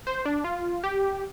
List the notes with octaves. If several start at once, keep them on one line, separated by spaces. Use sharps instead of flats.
C5
D4
F4
G4